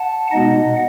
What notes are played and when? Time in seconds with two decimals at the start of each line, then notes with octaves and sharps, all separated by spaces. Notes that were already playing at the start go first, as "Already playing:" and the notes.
Already playing: F#5 A5
0.31 B2 G#3 B3 D#4 D#5 F#5